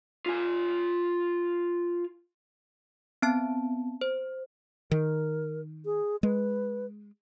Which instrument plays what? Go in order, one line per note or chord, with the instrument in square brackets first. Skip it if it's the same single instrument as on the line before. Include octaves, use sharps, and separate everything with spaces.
[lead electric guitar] F4 G#5
[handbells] B3 C4 A5
C5
[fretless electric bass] D#3 [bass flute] A#4
[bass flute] G#4
[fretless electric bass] G#3 [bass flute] B4